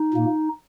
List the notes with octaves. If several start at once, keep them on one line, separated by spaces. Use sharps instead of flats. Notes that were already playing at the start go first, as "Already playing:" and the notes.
Already playing: D#4
A#2 A#3